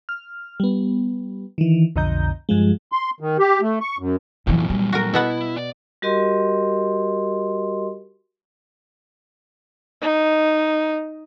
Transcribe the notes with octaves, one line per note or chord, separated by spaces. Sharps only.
F6
G3 B3
D#3 E3
B1 F2 D3 D#5 A#5 G6
G2 F3 G#3
C6
D#3
G4
A3
C#6
F#2
F2 A#2 E3 F#3
G3
F#4 A#4
B2 B3 E4 F#5
D5
G3 F#4 G4 A#4 D#5 C6
D#4